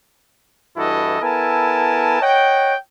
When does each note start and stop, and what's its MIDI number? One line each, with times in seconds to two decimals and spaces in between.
0.77 1.20 43
0.77 1.20 52
0.77 1.20 64
0.77 1.20 66
0.77 1.20 69
0.77 1.20 75
1.21 2.19 59
1.21 2.19 64
1.21 2.19 69
1.21 2.19 70
1.21 2.19 80
1.21 2.19 81
2.22 2.75 73
2.22 2.75 75
2.22 2.75 78
2.22 2.75 79